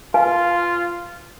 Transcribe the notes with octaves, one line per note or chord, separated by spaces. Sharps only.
F4 B4 F5 G#5